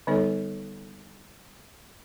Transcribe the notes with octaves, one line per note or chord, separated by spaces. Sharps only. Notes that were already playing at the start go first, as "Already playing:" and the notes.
D3 G3 B3 D#4 A4 C#5